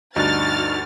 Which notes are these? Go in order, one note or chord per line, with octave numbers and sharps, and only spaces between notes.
D2 G2 D4 D#4 F#4 F6 A6